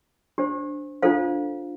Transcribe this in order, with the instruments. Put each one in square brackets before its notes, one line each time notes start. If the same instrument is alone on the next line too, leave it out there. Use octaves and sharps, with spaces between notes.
[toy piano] D4 G4 C5
D4 F4 A4 C5 F5